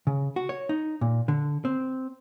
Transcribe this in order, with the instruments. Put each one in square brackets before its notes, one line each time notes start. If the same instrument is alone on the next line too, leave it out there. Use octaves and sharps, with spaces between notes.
[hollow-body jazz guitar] C#3
F#4
C#5
D#4
A#2
D3
C4